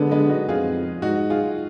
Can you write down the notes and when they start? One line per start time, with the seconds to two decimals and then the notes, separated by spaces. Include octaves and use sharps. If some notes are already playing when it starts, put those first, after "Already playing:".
Already playing: D3 G#3 B3
0.11 G#3 B3
0.29 D#4 F#4
0.48 F2 F4 G#4
1.02 G#2 D#4 F#4
1.30 F4 G#4